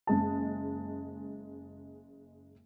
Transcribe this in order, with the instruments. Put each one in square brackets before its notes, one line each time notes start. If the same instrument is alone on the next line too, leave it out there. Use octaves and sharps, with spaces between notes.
[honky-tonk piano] F#1 G#3 A5